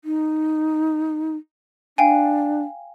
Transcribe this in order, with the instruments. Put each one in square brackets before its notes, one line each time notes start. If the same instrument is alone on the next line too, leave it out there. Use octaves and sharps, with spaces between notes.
[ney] D#4
[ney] D4 [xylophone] F5 G5 G#5